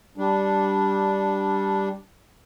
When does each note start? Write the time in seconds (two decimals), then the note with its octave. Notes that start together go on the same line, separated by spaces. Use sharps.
0.18 G3 D4